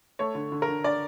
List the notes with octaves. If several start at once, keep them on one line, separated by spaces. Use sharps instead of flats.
A3 C#5
D3
D3
A#4
D3
D3 D5